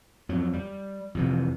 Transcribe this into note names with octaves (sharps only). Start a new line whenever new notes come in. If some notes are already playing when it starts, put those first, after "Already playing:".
F2 F#3
G3
F2 C3 E3